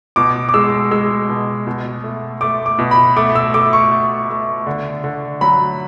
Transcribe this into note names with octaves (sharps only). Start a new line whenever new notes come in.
B2 D6
D6
G#3 E6
G#3 E6
B2
B2
A3
A3 D6
D6
B2
B5
A3 D6
E6
A3 D6
C#6
A3
A3
D3
D3
F#3 B5